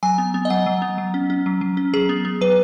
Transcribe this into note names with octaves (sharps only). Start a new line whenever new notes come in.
F#3 G#5
B3
B3
D#5
F#3 F#5
F#3
B3
F#3
C#4
C#4
F#3
F#3
C#4
F#3 G#4
B3
B3
F#3 B4